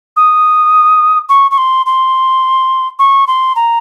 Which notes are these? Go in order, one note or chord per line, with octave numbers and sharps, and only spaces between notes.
D#6
C#6
C#6
C6
C6
C#6
C6
A#5